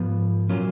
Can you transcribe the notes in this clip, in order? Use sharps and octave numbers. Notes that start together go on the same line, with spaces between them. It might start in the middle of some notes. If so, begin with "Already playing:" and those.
Already playing: G#2 F3 B3
A#2 F#3 A#3 C#4 F4